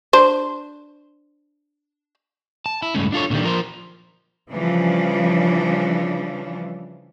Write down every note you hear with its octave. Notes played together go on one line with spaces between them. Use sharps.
D4 C5
A5
E4
C#2 G2 A3 C#4
D4 F4 A4 C#5
A#2 D3 D#3 G3
F3 A#4 C5
C#3 E3 F3 G3 C#4 D4